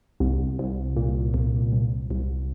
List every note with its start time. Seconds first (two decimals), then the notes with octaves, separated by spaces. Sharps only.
0.20 C2
0.59 C2
0.97 A#2
1.34 C2
1.72 C2
2.11 C2